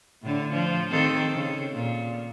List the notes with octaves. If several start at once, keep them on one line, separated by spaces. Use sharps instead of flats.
A2 D3
F3
D#3 C4 A4
C#3
A#2